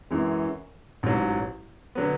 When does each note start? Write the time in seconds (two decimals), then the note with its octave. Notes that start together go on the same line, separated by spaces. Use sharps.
0.11 F#2 E3 G#3
1.03 A1 G#2 F#3
1.95 D3 F#3 B3